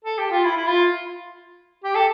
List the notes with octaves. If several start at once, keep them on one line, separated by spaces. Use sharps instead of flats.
A4
G4
F4
E4
E4
F4
G4
A4